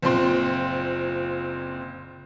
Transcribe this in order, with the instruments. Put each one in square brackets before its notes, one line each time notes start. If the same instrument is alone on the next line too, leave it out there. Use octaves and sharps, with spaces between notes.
[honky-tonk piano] F#1 A#2 C4 C6